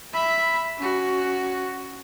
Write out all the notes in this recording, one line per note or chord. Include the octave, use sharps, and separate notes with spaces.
E5 B5
C#4 F#4